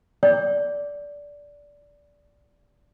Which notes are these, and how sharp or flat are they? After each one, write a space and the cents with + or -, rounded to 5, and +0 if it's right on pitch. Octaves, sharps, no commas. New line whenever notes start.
D5 -15